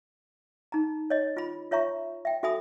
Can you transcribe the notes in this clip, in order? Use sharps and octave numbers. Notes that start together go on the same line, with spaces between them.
D#4 A#5
C#5 D#5
F4 B5
F4 C#5 E5 A#5 C#6
E5 G5
F#4 A4 E5 G#5 B5 D#6